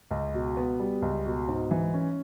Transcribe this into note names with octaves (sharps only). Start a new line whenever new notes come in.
C#2
B2
B3
G3
C#2
B2
G#2
E3
C#4